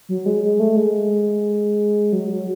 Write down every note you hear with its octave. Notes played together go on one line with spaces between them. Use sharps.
F#3
G#3
G#3
A3
G#3
F#3
F#3